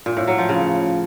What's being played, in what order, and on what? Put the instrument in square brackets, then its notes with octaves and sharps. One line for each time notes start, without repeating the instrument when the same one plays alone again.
[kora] A#2
A2
F#3
F3
C#3